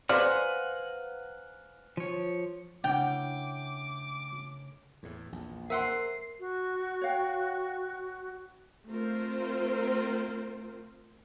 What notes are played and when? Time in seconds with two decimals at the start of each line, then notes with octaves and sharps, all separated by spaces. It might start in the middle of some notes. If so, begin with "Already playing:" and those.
0.09 B4 C5 D5 F5 F#5 G#5 A#5 F6
1.97 F3 C#5
2.84 C#3 A3 D4 E4 F#5 G5 D6
5.03 E2 A2
5.32 A#1 E2
5.70 A#4 C5 E5 F#5 C6 C7
6.40 F#4
7.01 C#5 F5 G5
8.88 A3 C4 F4 A#4 C5